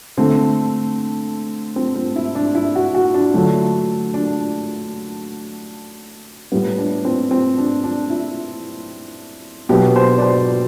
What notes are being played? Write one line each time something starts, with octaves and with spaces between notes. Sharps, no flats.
D3 A3 C4
C4
C4
E4
D4
E4
F#4
F#4
D4
D3 F#3 A3
D4
A2 G3 B3
D4
C4
C4
D4
D4
E4
B2 F#3 B3 G4
C5
D5
C5